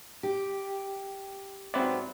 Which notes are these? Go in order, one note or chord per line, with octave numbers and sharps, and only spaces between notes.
G4
G#2 F#3 B3 C4 D5 E5 B5 C6